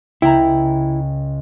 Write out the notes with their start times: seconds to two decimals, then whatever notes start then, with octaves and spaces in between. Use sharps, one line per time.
0.22 C#2 E4 G5 A#5